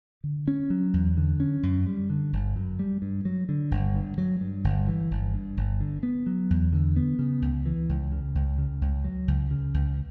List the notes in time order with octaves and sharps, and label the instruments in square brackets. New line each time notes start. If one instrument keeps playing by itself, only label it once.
[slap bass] D3
C#4
F#3
E2
D3
C#4
F#2
G3
D3
G1
F#2
G3
G2
F#3
D3
G1
G2
F#3
G2
G1
E3
G1
G2
G1
D3
B3
F#3
E2
D3
B3
C#3
C#2
E3
C#2
C#3
C#2
C#3
C#2
F#3
C#2
C#3
C#2